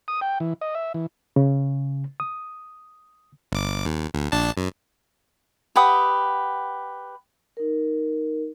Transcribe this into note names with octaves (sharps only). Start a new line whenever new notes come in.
D#6
G5
E3
D#5
E5
E3
C#3
D#6
G1 D6
D#2
D2
A#1 D4 A5
F#2
G4 B4 F#5 D#6
D#4 A#4